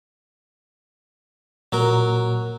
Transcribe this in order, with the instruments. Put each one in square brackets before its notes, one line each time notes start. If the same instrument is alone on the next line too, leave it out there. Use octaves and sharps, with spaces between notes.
[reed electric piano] A#2 [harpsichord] F#3 A#4